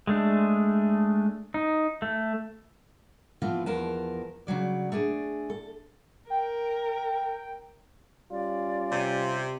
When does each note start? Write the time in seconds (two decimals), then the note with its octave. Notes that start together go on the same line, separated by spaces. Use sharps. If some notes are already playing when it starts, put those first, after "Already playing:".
0.07 G#3 A3 D4
1.54 D#4
2.02 A3
3.42 E3 F3 B3 C4 F4 B4
3.66 E2 F3 A#4 B4 A5
4.47 C#3 E3 F#3 D5
4.92 A3 D4 G#4
5.50 A4
6.30 A#4 G5
8.32 G3 C#4 F4 D5
8.91 C3